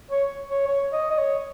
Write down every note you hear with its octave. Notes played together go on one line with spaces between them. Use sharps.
C#5
C#5
C#5
D#5
D#5
C#5